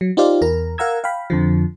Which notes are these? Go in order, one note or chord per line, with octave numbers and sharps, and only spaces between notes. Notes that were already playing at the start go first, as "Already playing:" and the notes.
F#3
D#4 F4 G4 C5 D5 F5
E2 A#4 A#5
A#4 F5 F#5 A#5 E6 G#6
F5 G5 B5
F2 D3 F3